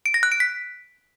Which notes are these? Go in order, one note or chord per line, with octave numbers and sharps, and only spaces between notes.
D7
A#6
F#6
D7
B6